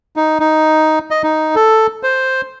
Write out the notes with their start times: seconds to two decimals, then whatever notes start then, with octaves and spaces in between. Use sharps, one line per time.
0.16 D#4
0.40 D#4
1.11 D#5
1.23 D#4
1.55 A4
2.03 C5